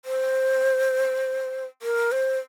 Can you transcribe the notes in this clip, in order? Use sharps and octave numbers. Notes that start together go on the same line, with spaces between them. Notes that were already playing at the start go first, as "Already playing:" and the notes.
C5
A#4
C5